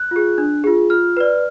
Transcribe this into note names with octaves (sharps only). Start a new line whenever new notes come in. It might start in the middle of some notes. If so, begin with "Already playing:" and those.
Already playing: F#6
F4 G#4
D4
F4 G#4
F4 F6
B4 D5